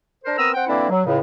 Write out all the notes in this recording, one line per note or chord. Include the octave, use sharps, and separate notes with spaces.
D4 A#4 C5
B3 C4 A#4 A#5 D#6 E6
C4 F#5 G5
D3 E3 A#3 C4 D4 E4
F#3
C#2 A2 C#3